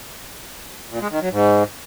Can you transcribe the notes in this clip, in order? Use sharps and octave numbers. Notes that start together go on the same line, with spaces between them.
A#2
G#3
D#3
F#3
G#2